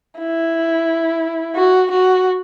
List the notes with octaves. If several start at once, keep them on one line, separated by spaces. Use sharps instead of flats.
E4
F#4
F#4